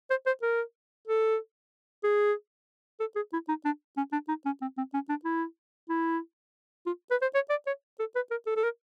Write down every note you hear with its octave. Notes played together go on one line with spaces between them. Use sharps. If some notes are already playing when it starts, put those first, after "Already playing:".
C5
C5
A#4
A4
G#4
A4
G#4
E4
D#4
D4
C#4
D4
D#4
C#4
C4
C4
C#4
D4
E4
E4
F4
B4
C5
C#5
D5
C#5
A4
B4
A#4
A4
A4
A#4